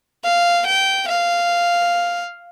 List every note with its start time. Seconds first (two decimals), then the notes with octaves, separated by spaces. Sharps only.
0.24 F5
0.66 G5
1.08 F5